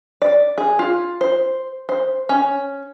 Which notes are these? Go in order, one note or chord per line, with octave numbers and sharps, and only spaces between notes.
D5
G#4
F4
C5
C5
C#4